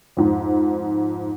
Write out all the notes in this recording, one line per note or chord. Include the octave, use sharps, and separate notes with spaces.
F2 G#2